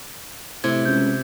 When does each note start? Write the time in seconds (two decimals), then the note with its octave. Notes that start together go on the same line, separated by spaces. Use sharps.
0.64 A2 C3 G#6
0.85 C#2 G6